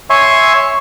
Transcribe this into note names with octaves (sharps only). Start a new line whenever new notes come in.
C#5 E5 G#5 C6 C#6